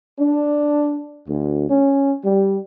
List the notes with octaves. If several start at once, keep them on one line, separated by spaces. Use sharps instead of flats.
D4
D2
C#4
G3